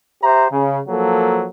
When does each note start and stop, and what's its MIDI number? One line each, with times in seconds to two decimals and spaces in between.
0.23 0.46 67
0.23 0.46 72
0.23 0.46 76
0.23 0.46 82
0.51 0.80 49
0.88 1.47 53
0.88 1.47 54
0.88 1.47 58
0.88 1.47 69